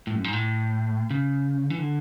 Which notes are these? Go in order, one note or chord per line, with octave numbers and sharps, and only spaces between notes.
A2
F#2
G#2
A2
C#3
E3
D3